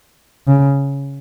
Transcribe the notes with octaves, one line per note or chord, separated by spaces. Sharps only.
C#3